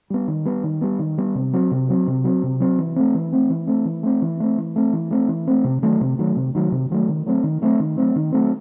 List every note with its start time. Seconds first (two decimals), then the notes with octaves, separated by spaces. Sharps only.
0.10 G3 B3
0.28 D#3
0.45 G3 B3
0.64 D#3
0.81 G3 B3
0.99 D#3
1.18 G3 B3
1.35 C3
1.53 F#3 C4
1.71 C3
1.89 F#3 C4
2.07 C3
2.24 F#3 C4
2.43 C3
2.60 F#3 C4
2.79 E3
2.96 A3 C4
3.14 E3
3.33 A3 C4
3.50 E3
3.67 A3 C4
3.85 E3
4.03 A3 C4
4.22 E3
4.40 A3 C4
4.58 E3
4.76 A3 C4
4.93 E3
5.11 A3 C4
5.28 E3
5.47 A3 C4
5.64 C3
5.82 D#3 F#3 A3
6.01 C3
6.19 D#3 F#3 A3
6.37 C3
6.55 D#3 F#3 A3
6.72 C3
6.90 D#3 F#3 A3
7.09 D#3
7.26 F#3 A3 C4
7.44 D#3
7.62 F#3 A3 C4
7.80 D#3
7.98 F#3 A3 C4
8.16 D#3
8.33 F#3 A3 C4